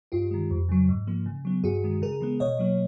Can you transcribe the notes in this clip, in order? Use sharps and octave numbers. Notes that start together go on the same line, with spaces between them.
G2 F4 G4
D#3 G#3
F2
C#3 F#3
G#2
F3 A#3
C#3
F#3 B3
G2 F#4 G#4
D#3 G#3
C#3 G#4 A#4
E3 G#3 B3
B2 C#5 D#5
F#3 A#3